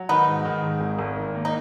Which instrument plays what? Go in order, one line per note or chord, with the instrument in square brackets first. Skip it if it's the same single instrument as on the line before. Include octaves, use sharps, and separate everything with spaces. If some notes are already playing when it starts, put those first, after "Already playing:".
Already playing: [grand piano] F#3
[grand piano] D#3 [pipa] B3 D#4
[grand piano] G#2
D#3
G#2
G#1
G#1
D#3
A#3
[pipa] D#4